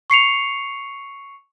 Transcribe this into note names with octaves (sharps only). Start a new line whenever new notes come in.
C#6 C7 C#7 F7